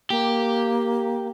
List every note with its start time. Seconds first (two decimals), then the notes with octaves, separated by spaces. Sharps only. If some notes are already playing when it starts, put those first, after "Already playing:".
0.10 A#3 G4